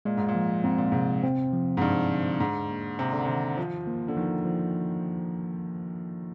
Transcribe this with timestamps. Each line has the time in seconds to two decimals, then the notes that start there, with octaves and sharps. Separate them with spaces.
0.05 A#2 G#3
0.17 G#2
0.29 A#2
0.35 F3
0.64 G#2 C4
0.78 A#2
0.92 G#2 C3
1.23 C4
1.53 F3
1.77 G#2
1.81 G2 D#4
2.11 D3
2.40 G#2 D4
2.70 A#3
2.99 C3 G4
3.13 D3
3.25 C3 D#3
3.57 F3 F4
3.87 A#3
4.08 D3
4.17 D#3 F3
4.45 F3